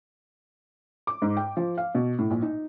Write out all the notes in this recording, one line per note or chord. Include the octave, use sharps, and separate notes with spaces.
D6
G#2
G5
F3
F5
B2
A2
A#1
D#4